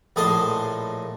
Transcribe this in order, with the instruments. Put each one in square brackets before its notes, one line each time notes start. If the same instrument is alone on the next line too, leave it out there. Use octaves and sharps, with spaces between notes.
[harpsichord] A#1 A2 G#4 D#5 A5 C6